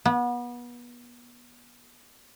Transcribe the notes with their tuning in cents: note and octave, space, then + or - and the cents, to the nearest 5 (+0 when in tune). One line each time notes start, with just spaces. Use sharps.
B3 -30